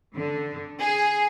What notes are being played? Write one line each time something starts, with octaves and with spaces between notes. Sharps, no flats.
D3
G#4